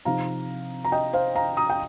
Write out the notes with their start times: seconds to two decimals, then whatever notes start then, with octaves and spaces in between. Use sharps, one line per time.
0.05 C3 F3 C4 D#4 F5 A#5
0.85 A#5
0.92 D#5 G5
1.13 C5 F5
1.35 F5 A#5
1.57 A#5 D#6
1.70 G5